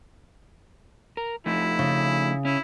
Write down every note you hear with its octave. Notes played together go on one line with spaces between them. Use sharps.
A#4
F3 A3 D#4 E4
C#3
C#4 E4